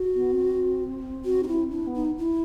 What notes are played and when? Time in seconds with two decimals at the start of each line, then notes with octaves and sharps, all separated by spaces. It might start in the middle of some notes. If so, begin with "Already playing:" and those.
Already playing: F#4
0.15 B3
0.32 C4
1.25 F#4
1.43 D#4
1.47 E4
1.70 D4 E4
1.87 B3
1.94 D#4
2.18 E4